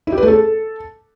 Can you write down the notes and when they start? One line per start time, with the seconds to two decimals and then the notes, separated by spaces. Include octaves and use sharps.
0.07 E4
0.12 G4
0.18 B4
0.23 A3
0.28 A4